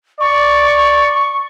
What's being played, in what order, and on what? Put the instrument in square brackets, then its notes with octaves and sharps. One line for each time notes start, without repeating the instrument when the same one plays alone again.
[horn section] D5 [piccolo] C#6